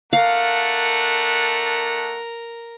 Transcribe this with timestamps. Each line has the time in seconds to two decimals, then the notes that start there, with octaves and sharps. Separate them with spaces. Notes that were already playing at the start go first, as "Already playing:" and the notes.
0.13 A3 D4 A#4 F5 F#5